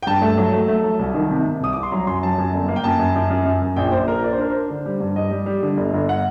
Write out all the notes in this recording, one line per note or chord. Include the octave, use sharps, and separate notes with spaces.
G5
G2 A5
A3
F#3
A3
A3
F#3
C2
D#3
C3
C3
C2 D#6
C2 D6
C6
F#3 A#5
F#2 C6
F#3 A5
F#2
G1
A#3
G5
F#2 A5
F#2
F#2
F#2
F#2
F#2
A#1 G5
A#1 C5
A#1 A#4
D4 D5
C5
D4 A#4
D4 C5
D3
G3
G2
G3 D#5
G3
G3
D3
G1
G1
F#5